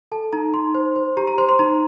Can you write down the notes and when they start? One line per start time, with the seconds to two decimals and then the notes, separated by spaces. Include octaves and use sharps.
0.12 A4 A5
0.33 D#4 A#5
0.54 D#4 C6
0.75 C5
0.96 C5
1.17 G4 A#5
1.27 A#5
1.38 C5 C6
1.49 C6
1.59 D#4 A#5